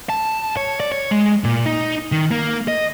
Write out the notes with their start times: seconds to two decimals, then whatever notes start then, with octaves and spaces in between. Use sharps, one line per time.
0.09 A5
0.57 C#5
0.80 D5
0.92 C#5
1.11 G#3
1.44 A#2
1.66 D#4
2.12 D#3
2.31 A#3
2.68 D#5